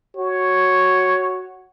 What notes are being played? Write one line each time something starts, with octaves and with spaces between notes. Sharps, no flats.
F#4 C#5